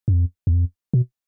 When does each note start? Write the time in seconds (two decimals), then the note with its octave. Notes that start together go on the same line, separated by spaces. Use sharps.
0.08 F#2
0.13 F2
0.47 E2
0.53 F2
0.94 B2